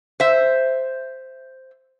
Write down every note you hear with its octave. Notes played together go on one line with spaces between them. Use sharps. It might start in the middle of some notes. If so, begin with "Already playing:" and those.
C5 E5